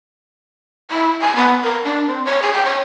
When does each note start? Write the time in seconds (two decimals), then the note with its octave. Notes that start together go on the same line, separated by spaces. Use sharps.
0.91 E4
1.22 G#5
1.36 B3
1.64 A#4
1.85 D4
2.08 C4
2.25 C#5
2.42 G#4
2.54 G5
2.65 C#5